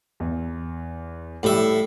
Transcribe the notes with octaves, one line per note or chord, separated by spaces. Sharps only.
E2
A2 G3 G4 E5